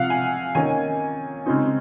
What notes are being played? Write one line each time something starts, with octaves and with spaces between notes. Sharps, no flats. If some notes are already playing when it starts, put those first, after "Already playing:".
Already playing: C3 F3 F5 F#5
G#5
D#3 A#3 C#4 G#5
C#3 G#3 C4 D#4